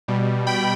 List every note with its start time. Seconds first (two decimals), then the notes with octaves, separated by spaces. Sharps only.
0.08 B2 G3
0.47 G5 B5